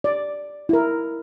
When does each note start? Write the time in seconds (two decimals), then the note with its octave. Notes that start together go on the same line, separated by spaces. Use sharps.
0.04 D5
0.69 E4 A#4